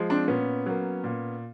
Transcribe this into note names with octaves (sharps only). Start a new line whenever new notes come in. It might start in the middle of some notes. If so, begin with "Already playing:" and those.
Already playing: F3 G#3
C4 D4
A#2 B3 C#4
F#3 A#3
A#2